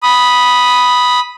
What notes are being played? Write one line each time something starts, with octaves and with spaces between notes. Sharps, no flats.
B5 D#6